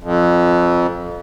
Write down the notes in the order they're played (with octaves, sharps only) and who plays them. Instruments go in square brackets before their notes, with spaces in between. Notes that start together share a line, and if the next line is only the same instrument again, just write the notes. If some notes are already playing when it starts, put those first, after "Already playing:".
[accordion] F2